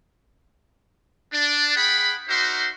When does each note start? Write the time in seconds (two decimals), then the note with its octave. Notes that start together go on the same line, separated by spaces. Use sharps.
1.33 D4
1.76 G#4 F#5 G5 B5
2.28 D#4 F#4 A#4 C5 E5 C6